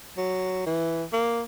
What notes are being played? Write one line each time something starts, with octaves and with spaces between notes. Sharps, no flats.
F#3
E3
A#3